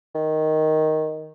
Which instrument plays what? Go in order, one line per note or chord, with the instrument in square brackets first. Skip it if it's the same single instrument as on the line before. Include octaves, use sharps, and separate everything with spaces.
[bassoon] D#3